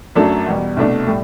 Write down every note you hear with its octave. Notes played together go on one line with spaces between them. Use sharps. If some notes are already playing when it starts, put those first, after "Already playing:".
F#2 F#3 A3 D4 A4
E2 B2 G3
C2 B2 A3 D4
A2 G3